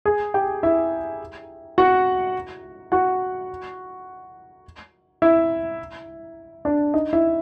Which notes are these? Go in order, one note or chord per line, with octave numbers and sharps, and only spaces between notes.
G#4 G#5
G4 G5
E4 E5
F#4 F#5
F#4 F#5
E4 E5
D4 D5
D#4 D#5
E4 E5